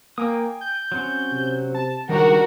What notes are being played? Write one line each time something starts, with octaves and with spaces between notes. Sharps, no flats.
A#3 G5 G#5 D#6
G6
F#3 C4 C#4
C3
A5
C#2 D#3 G3 D4 F#4 A#4